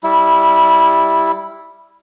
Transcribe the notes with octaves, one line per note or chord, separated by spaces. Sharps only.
G3 E4